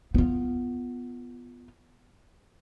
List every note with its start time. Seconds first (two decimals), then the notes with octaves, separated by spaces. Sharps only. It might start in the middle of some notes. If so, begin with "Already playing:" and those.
0.14 B3 F4